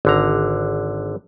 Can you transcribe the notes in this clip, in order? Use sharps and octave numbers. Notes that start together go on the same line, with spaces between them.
G#1 D3 A#5